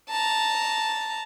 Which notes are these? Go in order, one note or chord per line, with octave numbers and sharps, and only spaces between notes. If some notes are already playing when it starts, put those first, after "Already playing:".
A5 A#5